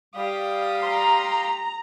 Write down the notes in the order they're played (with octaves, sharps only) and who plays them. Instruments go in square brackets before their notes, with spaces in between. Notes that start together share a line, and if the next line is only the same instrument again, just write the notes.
[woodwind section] G3 F5 [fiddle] G4 D#6
[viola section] A#5 [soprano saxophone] C6